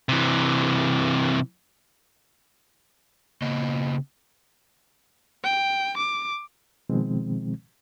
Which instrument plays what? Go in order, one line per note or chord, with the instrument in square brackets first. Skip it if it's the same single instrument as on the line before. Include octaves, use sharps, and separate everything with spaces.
[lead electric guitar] C3 E3
[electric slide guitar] C#3 A#3 D#5
[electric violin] G5
D6
[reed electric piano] B2 D#3 F3 G#3 C4